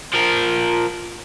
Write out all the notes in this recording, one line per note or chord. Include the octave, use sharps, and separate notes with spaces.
F3 A#4